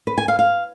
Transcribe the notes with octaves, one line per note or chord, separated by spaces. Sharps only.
B4
G#5
F5
F5